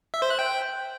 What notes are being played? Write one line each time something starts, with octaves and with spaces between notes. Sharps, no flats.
E5
C5
F#6
G5